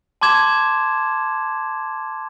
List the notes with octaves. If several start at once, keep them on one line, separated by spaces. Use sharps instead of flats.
A5 C6 D6 G#6 E7